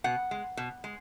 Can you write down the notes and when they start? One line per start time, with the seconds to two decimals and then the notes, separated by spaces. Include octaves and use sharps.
0.04 B2 F#5
0.31 G#3
0.57 B2
0.84 G#3